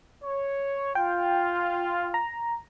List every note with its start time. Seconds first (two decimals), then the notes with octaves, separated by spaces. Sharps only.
0.22 C#5
0.95 F4 G5
2.14 A#5